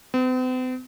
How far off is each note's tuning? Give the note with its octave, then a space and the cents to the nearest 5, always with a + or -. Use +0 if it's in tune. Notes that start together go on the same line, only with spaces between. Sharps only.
C4 -45